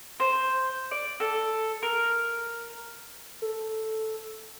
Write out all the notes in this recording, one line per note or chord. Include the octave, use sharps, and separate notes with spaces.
C5
D5
A4
A#4
A4